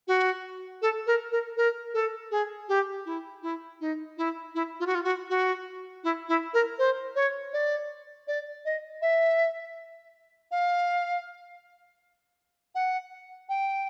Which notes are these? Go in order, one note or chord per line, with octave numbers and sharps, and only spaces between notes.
F#4
A4
A#4
A#4
A#4
A4
G#4
G4
E4
E4
D#4
E4
E4
F4
F#4
F4
F#4
F#4
E4
E4
A#4
C5
C#5
D5
D5
D#5
E5
F5
F#5
G5